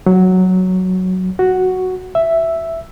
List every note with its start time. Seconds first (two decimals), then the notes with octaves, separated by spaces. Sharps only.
0.06 F#3
1.39 F#4
2.15 E5